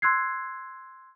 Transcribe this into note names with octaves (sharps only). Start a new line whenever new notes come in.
C6 E6 F#6 G#6 C7